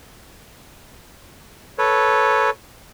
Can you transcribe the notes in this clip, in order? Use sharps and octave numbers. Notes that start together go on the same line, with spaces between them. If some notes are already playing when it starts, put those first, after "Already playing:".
A4 B4 C#5